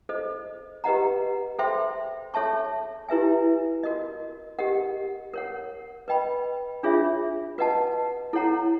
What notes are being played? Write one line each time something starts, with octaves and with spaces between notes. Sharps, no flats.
A4 C5 D#5
G4 B4 D#5 F#5 A#5
A4 C5 E5 G5 C6
A4 C#5 E5 A5 C#6
E4 G4 B4 E5 G#5
F#4 A#4 D#5
G4 A#4 D#5 F#5
A#4 C#5 F#5
B4 D#5 G5 B5
D4 F4 G#4 C#5 E5
F#4 B4 D#5 F#5 A5
E4 A4 C#5 F#5 A#5